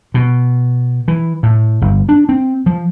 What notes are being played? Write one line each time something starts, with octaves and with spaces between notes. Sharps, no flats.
B2
E3
A2
G1
D4
C4
F3